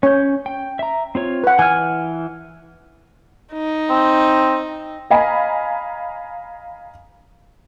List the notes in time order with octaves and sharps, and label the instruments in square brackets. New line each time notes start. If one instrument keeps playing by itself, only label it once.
[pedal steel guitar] C#4 G6 [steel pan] C#5
[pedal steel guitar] G5
E5 A#5
C4 F4 C#5
[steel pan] B4 F#5
[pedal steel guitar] E3 F6 [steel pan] G#5
[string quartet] D#4
[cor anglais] C4
[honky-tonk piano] D#5 F5 G#5 A#5 B5